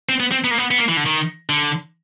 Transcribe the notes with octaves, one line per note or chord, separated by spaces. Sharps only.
C4
B3
C4
B3
A#3
B3
B3
A#3
E3
D3
D#3
D3